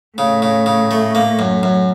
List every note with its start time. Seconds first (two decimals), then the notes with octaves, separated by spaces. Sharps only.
0.18 A2 C#3
0.42 C#3
0.66 C#3
0.91 A3
1.15 A#3
1.39 F#2
1.63 F#2